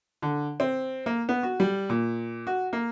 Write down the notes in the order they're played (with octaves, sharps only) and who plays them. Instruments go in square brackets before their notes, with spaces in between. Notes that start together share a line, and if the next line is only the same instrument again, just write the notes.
[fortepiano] D3
C4
A#3
B3
F#4
G3
A#2
F#4
A#3